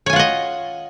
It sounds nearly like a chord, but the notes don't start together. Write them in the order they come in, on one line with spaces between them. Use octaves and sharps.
C#5 G#5 F4 F#5 D#5